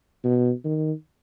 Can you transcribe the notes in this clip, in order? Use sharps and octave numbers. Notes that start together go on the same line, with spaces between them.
B2
D#3